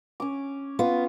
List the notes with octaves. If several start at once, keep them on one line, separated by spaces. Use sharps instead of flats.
C#4 D6
B3 F4